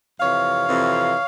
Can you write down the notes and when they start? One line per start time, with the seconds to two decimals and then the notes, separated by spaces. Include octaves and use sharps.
0.20 F2 C3 E3 C#5 F5
0.69 F2 C3 E3